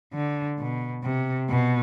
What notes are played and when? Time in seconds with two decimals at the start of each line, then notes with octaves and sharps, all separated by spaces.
0.14 D3
0.59 B2
1.04 C3
1.49 B2